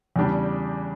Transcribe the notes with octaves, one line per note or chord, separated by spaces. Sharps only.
E2 C#3 G3 D4 G4